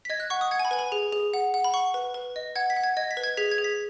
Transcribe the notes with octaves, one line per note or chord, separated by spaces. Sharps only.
B6
D#5 G#6
F#6
F#5 C#6
D#6
F#5 G#6
G#5
B5
B4 G#5
B5
G#4
G#4
F#5
F#5
B5
F#5 C#6
B4
B4
D#5
F#5 G#6
B6
F#5
G#6
D#5 G#6
B6
B4
G#6
G#4 B6
G#6
G#4
B6